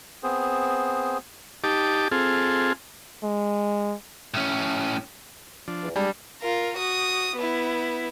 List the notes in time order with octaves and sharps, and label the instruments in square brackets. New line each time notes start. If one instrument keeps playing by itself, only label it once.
[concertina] B3 C4 G#4 C5
[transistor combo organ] D#4 G4 A5 D6
C4 F4 G#4 A4
[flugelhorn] G#3
[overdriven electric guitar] A2 C#4
[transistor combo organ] F3 D4
[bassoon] E2
[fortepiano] G3 [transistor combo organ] G#3 [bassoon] D4
[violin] F4 A#4
F#4 D#6
B3 E4